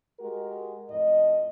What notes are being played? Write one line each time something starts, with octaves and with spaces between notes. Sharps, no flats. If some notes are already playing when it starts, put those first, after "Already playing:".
G#3 F#4 G4 A#4
F2 A2 D#5